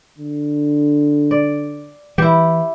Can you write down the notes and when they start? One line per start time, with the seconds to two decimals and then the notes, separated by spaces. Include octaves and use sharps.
0.18 D3
1.31 D5
2.18 E3 E4 G4